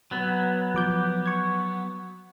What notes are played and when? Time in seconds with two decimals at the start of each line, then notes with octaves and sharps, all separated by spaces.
0.11 F#3 B3
0.75 F3 D6 G6
1.26 C#6 G#6